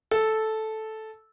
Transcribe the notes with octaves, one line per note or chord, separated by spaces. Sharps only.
A4